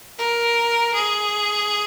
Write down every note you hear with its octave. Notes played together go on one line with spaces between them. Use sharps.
A#4
G#4